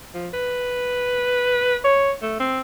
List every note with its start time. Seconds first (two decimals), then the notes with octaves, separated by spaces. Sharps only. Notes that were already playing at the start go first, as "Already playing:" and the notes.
0.14 F3
0.33 B4
1.84 C#5
2.22 A3
2.40 C4